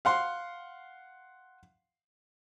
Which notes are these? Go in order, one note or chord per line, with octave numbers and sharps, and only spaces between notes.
F5 F#5 C6